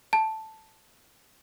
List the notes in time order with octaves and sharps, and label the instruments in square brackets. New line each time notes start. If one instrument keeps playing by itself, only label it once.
[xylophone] A5